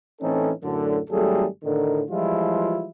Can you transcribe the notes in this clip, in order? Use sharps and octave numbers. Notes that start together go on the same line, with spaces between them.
A2 E3 C4 C#4 D#4 A4
F#2 A2 D3
G#1 F#3 G3 A3 G#4 A4
A2 D3 D#3
E3 F3 G3 G#3 E4 F4